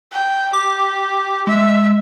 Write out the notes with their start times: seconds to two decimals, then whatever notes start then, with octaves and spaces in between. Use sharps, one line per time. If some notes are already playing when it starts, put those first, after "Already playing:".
0.13 G5
0.53 G4 D6
1.47 G#3 E5